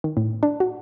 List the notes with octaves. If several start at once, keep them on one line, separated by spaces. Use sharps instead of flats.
D#3
A2
D4
F#4